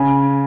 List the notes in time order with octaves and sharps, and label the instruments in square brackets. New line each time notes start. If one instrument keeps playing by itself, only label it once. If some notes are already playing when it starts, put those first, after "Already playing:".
Already playing: [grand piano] C#3 G#5